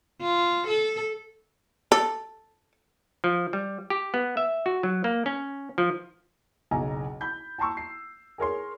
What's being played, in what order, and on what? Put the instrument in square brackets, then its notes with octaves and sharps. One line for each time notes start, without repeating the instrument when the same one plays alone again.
[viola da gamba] F4
A4
[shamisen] A4
[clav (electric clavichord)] F3
G3
G4
B3
E5
F#4
F#3
A#3
C#4
F3
[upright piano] F#1 B1 G#5 A#5
B5 G6
G5 A5 A#5 C6 C#6 E6
C7
G#4 A#4 C#5 C6